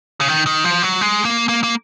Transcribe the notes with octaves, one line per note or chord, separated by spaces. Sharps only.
C#3
D#3
D#3
F3
F#3
G#3
A#3
A#3
A#3